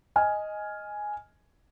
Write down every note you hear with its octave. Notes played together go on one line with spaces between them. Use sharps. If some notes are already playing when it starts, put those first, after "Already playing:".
D#5 G#5 F6